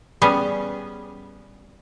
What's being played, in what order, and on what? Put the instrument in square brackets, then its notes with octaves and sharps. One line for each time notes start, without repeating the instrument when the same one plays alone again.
[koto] G3 B3 C#4 G#4